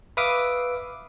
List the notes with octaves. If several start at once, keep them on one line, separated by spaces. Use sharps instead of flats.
B4 E5 F5 D6 D#6